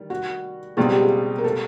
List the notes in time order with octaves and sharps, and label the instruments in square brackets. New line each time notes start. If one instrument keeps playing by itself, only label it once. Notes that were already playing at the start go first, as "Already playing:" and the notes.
Already playing: [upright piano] D#3 G3
[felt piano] F#4
[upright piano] C#2 B2 G3 C4 F4 [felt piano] G#4
[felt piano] G4
G#4
A#4
A4